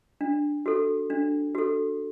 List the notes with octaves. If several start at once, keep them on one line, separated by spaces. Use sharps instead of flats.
D4
F#4 A4
D4
F#4 A4